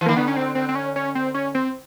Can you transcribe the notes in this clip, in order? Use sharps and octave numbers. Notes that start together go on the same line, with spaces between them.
E3
D#3 A#3
D3 B3
C#4
C4
C4
C4
C#4
C#4
C4
C#4
C4